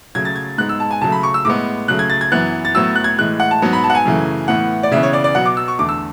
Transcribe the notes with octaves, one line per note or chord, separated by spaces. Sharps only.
C#3 F#3 A3 G#6
A6
G#6
G#2 G#3 B3 F#6
E6
A5
G#5
C#3 F#3 A3 A5
B5
C#6
E6
A2 G#3 B3 D6
C#3 F#3 A3 F#6
G#6
A6
G#6
F#2 E3 B3 F#6
A6
A2 F#3 B3 E6
F#6
G#6
A2 E3 G#3 F#6
F#5
A5
G#2 F#3 B3
B5
A5
F#5
G#5
F#2 C#3 E3 A3
A2 E3 B3 F#5
D5
C#3 E3 B3 E5
C#5
D5
D5
B2 F#3 B3 F#5
D6
E6
C#6
E2 D3 A3 D6
E6